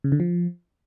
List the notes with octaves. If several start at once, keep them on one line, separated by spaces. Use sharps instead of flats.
C#3
D3
F3